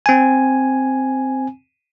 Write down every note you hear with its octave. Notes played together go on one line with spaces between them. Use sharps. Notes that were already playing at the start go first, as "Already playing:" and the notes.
C4 G#5